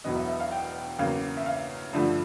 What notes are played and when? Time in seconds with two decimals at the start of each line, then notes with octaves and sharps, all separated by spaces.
0.04 E1 E2 B2 F#3 B3 D#5
0.16 E5
0.28 E5
0.40 F5
0.52 G5
0.98 E2 C#3 F#3 A#3 F5
1.37 E5
1.46 F5
1.93 G2 D3 F3 A3